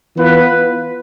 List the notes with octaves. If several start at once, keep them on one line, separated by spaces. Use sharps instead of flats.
E3 B3 F4 B4